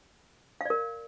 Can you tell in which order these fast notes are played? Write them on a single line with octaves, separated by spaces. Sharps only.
F5 D5 A#4